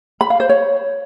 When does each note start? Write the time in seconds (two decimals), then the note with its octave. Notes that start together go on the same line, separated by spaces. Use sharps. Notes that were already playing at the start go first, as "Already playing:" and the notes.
0.21 B5
0.30 F5
0.40 C5
0.49 C#5